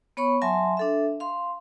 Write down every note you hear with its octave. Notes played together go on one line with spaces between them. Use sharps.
B3 C#5 B5 C#6
F#3 E5 G#5 A5 C6
D4 A4 E5
F5 C6